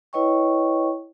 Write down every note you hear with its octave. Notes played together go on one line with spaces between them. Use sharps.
E4 B4 C#5 D#5 G5 C#6